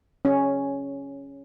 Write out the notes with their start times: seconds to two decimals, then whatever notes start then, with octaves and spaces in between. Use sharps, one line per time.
0.25 C#4